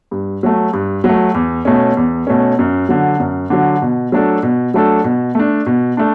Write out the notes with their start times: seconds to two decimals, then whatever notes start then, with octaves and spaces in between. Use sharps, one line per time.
0.11 G2
0.43 F#3 A3
0.73 G2
1.04 F#3
1.09 A3
1.34 E2
1.65 B2 A3 C#4
1.97 E2
2.27 B2 A3 C#4
2.59 F#2
2.89 D3 F#3
3.20 F#2
3.50 D3 F#3
3.82 B2
4.12 F#3 A3 D4 A4
4.43 B2
4.74 F#3 A3 D4 A4
5.04 B2
5.35 A3 D4
5.66 B2
5.97 A3 D4